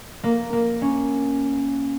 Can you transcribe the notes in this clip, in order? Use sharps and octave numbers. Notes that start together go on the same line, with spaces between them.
A#3
A#3
C#4